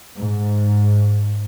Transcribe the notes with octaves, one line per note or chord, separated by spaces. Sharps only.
G#2